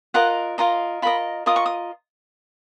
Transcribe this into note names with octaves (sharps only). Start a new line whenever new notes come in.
F4 A#4 D#5 F#5
F4 A#4 D#5 A#5
F4 A#4 D#5 B5
F4 A#4 D#5 D#6
C#6
D#6